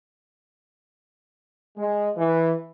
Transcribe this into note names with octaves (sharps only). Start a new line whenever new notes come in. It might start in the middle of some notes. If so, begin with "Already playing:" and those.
G#3
E3